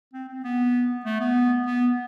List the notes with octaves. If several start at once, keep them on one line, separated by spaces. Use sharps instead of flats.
C4
C4
B3
A3
B3
B3